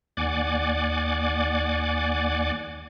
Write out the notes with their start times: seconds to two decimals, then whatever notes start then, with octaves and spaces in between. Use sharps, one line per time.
0.17 D#2 D5 F#5 G#5 D6